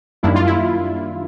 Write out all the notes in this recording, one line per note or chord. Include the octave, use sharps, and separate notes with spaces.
F#2 D#3 G3 A#3 D4 E4
F4
E4